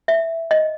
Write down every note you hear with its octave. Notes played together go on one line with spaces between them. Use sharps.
E5
D#5